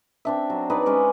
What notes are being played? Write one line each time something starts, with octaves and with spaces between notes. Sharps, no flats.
C4 D4 E5
F#3
D#4 G#4 B4 D5
G#3 C#4 D5